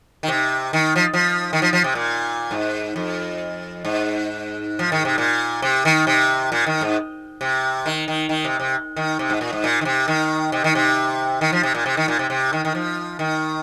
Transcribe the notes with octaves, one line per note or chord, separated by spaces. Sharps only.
D#3
C3
D#3
F3
F3
D#3
F3
F3
C3
A#2
G#2
F2
G#2
F3
D#3
C3
A#2
C3
D#3
C3
A#2
D#3
G#2
C3
D#3
D#3
D#3
C3
C3
D#3
C3
G#2
A#2
G#2
A#2
D#3
C3
D#3
C3
D#3
C3
D#3
F3
C3
A#2
C3
D#3
A#2
C3
C3
D#3
D#3
F3
D#3